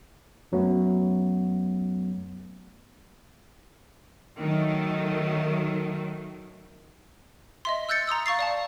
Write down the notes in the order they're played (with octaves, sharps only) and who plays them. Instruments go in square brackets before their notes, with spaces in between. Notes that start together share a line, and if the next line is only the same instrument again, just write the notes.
[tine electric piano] F#2 F#3 A3 B3
[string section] D#3 F#3 A3
[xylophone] D#5 E5 C6
E6 F#6 G6 A6 C#7
A#5 C6 D#6 E6
F5 C#6 A6 C7
D5 F5 A5